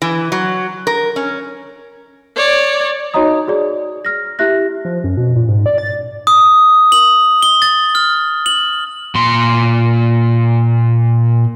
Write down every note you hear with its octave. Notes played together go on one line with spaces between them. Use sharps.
E3
F#3
A#4
C#4
C#5 D5
D#4 F#4 C#5 D#5 A#5 D#6
F#4 G#4 D5
F6 A#6
E4 G4 E5 F#6 A#6
F3
F#2
B2
A#2
G#2
D5
A6
D#6
F#7
G7
A6
F6
F#7
A#2 C6